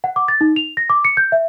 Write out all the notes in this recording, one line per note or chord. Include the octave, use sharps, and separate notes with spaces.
F#5
D6
A6
D#4
F7
A#6
D6
C#7
G6
E5